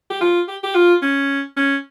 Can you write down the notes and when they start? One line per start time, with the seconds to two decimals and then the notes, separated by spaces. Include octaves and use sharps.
0.10 G4
0.21 F4
0.48 G4
0.64 G4
0.75 F4
1.02 C#4
1.57 C#4